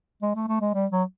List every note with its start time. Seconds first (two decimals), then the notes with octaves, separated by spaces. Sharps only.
0.22 G#3
0.36 A3
0.48 A3
0.61 G#3
0.74 G3
0.91 F#3